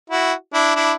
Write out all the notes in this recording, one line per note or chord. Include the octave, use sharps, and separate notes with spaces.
E4 F#4
D4 E4
D4 E4